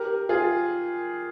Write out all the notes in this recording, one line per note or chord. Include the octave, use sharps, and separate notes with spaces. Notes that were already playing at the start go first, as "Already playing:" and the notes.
Already playing: G4 A#4
F4 G#4